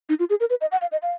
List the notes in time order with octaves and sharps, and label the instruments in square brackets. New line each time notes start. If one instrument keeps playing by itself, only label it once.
[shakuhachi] D#4
F4
G#4
A#4
B4
D#5
F#5
F5
D#5
F5